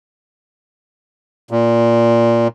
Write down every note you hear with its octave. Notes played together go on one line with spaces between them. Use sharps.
A#2